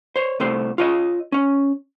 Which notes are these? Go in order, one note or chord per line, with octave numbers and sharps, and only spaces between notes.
C5 C#5
C2 C3 A3 C5
F4 C#5 D#5
C#4 C#5